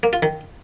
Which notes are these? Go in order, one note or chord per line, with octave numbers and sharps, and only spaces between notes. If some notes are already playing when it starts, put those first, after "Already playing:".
A#3
F4
D#3